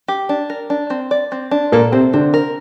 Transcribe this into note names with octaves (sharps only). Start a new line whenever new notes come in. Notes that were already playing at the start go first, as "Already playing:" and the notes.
G4
D4
A#4
D4
C4
D5
C4
D4
A#2 A#3 A4
C3 C4 C5
D3 C4 D4
A#4